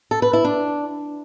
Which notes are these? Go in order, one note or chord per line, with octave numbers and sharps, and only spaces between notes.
A4
B4
E4
D4